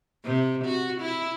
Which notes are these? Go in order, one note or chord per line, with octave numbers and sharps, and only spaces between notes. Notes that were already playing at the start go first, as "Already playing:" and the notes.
C3
F#4
E4